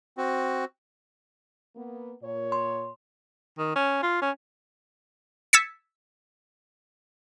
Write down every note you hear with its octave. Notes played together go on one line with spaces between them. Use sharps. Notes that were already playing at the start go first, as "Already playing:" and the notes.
C4 F#4
A#3 B3
A#2 C#5
C6
D#3
C#4
F4
C#4
E6 G#6 A6 B6 C#7